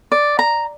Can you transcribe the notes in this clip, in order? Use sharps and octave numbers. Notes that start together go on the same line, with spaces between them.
D5
A#5